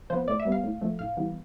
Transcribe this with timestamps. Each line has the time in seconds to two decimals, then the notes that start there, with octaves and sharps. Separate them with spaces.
0.10 F3 B3 C5
0.28 A2 D5
0.40 E5
0.45 G3 B3
0.52 F5
0.64 A2
0.81 F3 A3
0.99 A2 F5
1.17 E3 G3 B3